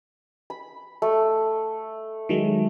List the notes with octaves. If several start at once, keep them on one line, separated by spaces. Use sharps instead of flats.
B5
A3
D#3 F#3 G#3